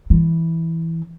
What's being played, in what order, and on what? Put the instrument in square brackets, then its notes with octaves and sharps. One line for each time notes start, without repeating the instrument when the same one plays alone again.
[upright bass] E3